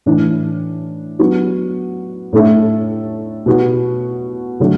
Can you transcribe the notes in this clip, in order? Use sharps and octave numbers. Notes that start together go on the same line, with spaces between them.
A2 E3 D4
F#3 B3 D4 F#4
A2 A3 D4 A4 E5
B2 B3 F#4
D3 F#3 A3 D4